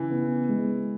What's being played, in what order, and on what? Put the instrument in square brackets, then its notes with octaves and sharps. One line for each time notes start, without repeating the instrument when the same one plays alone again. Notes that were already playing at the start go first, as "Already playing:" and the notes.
Already playing: [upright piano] C#3 [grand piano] E3
[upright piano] B3
G#3